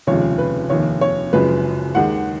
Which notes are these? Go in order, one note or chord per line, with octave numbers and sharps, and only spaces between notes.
F1 D#2 C#3 F3 G#3 C#5
B4
F1 D#2 D#3 C#5
C#5
F#1 F#2 F3 G#3 B4
D#2 D#3 G#3 F#5